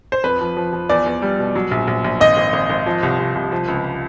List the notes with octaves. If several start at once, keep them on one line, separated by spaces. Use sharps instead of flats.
C5
F2 B4
F3
F3
F3
E2 D5
E2
G3
B2
F#3
A#1
A#1
A#1
G#1 D#5
G#1
G#1
G#1
F3
C2
C2
C2
F3
C#2